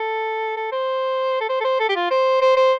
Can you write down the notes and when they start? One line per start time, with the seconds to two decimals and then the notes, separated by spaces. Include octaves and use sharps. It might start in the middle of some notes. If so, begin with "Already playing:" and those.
Already playing: A4
0.57 A4
0.72 C5
1.41 A4
1.49 C5
1.61 A4
1.64 C5
1.80 A4
1.89 G4
1.96 F4
2.11 C5
2.42 C5
2.57 C5